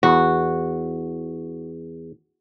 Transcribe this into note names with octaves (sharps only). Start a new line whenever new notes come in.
E2 F#4